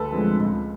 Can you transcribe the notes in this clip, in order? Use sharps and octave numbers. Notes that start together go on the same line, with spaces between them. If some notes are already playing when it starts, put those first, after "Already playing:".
Already playing: D2 A4 B4
D3 F3 G#3 C4
C#2